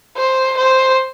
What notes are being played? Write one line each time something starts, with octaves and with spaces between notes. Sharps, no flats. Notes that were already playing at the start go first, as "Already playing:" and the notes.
C5
C5